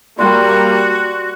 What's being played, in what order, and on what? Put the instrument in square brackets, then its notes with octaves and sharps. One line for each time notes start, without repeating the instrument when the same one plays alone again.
[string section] G3 A#3 [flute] F#4 [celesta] D5 C6